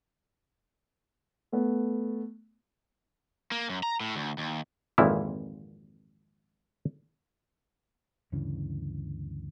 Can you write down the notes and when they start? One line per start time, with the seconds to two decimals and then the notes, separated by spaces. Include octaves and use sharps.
1.52 A3 B3
3.52 A#3
3.69 F#2
3.83 A#5
4.00 A2
4.16 D2
4.38 D#2
4.98 G#1 F2 A#2 E3 F3 E4
8.32 D2 G2 C#3 E3